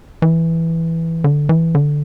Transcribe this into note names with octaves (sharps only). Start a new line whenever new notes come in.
E3
D3
E3
D3